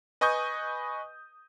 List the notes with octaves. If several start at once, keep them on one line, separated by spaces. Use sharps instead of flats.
B4 D#5 G#5 C#6 D#6 G6